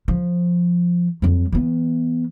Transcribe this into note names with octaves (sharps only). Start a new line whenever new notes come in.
F3
F2 F#3
E3 B3